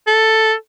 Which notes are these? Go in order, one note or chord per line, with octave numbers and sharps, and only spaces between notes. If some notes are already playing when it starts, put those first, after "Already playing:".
A4